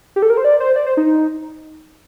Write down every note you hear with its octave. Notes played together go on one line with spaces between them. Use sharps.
G4
A4
A#4
C5
D5
C5
D5
C5
D#4